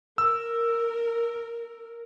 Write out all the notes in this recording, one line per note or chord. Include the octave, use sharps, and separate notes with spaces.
A#4 E6